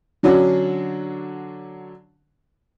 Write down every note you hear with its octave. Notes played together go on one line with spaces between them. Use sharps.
D3 F#3 C#4 D4 F#4